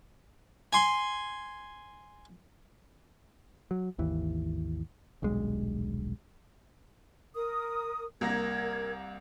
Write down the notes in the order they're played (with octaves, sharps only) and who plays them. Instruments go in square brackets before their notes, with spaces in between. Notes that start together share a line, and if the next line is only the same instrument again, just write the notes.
[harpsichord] G#5 C6
[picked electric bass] F#3
G#1 D#2 E3
D#1 B1 G2 G#3
[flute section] A#4 D#6
[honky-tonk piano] C2 A#3 A#6 [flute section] A#4 G#6